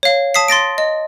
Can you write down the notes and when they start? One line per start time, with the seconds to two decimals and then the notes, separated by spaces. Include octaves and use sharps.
0.03 C#5 F5
0.34 A5 D#6 B6 C7
0.48 C6 A6 A#6 D7
0.78 D#5